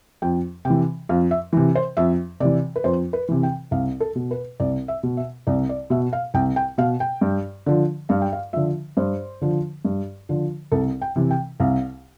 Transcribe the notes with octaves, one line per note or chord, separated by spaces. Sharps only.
F2 G5
C3 G5
E3
F2 F5
E5
C3 E3
C5
F2 E5
C3 E3 D5
B4
F2 C5
B4
C3 E3
G5
C2 F5
A4
B2
B4
C2 D5
E5
B2
E5
C2 D5
D5
B2 E5
F5
C2 G5
G5
B2 F5
G5
G2
D3 F3
G2 F5
G5
F5
D3 F3 E5
G2 C5
D3 F3
G2
D3 F3
C2 A4
G5
C3 E3
G5
C2 F5